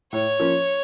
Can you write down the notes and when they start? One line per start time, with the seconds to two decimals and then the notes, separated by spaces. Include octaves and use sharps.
0.13 A2 C#5
0.40 F3 A#3 C#4